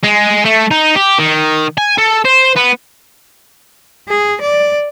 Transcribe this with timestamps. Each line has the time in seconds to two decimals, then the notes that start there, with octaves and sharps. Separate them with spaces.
0.03 G#3
0.45 A3
0.71 D#4
0.96 G4
1.19 D#3
1.78 G#5
1.98 A4
2.25 C5
2.56 B3
4.08 G#4
4.41 D5